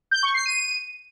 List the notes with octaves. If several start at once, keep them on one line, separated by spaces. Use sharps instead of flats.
G6
C#6
C7
D#7